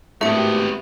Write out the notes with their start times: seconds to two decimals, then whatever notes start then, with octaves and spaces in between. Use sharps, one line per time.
0.21 G#1 A2 A3 B3 G4 E5 C#7